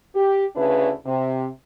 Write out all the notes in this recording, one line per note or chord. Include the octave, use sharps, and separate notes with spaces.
G4
D2 C#3 D4 E4 B4
C3